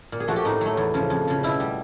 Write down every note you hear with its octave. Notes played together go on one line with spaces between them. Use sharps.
A#2
G#4
F3 A3 F#4
G4
A2 D#4
F#3 A3
E2
C#3 F3
F2
C#3 F3
B2 E4
G3